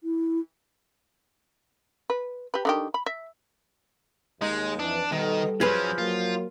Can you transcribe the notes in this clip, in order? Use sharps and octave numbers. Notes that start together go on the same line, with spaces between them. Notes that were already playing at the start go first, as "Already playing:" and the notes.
E4
B4
G4 B4
D3 D#3 G4
B5
E5
D#2 G#3 D#4
F2 E3 D4
B2 D#3 G3 A4
F3 F#3 C#4 G#4 B4
F#3 A#3 F4